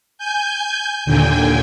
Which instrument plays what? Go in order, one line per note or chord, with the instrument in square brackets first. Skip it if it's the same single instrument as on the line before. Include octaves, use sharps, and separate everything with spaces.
[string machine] G#5 G6
D#2 A#2 D3 G5 G#5